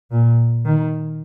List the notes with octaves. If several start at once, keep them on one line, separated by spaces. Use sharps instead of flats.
A#2
D#3